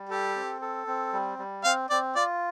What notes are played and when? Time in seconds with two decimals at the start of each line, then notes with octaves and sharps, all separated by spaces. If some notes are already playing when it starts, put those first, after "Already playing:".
Already playing: G3
0.10 G4 A4
0.36 C4
0.62 A4
0.87 C4
1.13 G3
1.39 G3
1.64 C4 F5
1.90 C4 D5
2.15 F4 D5